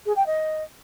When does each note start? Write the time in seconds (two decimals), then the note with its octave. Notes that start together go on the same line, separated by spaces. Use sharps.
0.06 G#4
0.16 G5
0.26 D#5